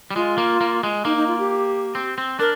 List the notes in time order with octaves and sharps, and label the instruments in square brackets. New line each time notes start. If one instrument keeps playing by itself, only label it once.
[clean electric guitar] G3
[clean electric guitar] G#3 [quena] F4
[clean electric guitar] A#3
A#3
G#3
[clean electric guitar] A#3 [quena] D#4
[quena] D#4
F4
G4
[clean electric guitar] C4
C4
[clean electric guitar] D4 [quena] A#4